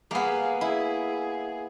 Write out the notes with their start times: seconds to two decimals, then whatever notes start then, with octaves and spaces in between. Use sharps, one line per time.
0.11 A#3 B3 G#4 F5
0.61 E4 G#4